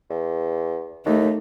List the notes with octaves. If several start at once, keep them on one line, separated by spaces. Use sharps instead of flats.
E2
D#2 A3 D#4